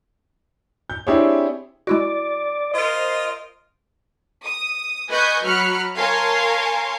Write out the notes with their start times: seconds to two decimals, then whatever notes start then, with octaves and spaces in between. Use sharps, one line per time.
0.90 G6
1.07 C4 D4 E4 G4 G#4 C#5
1.87 G#3 E4 F#4 D5
2.74 F4 A#4 C5 D#5
4.44 D#6
5.10 B4 D#5 G#5 C#6 D#6 G6
5.46 F#3 B5 F6 F#6 C#7
5.98 A#4 C#5 F5 G#5 A5 C6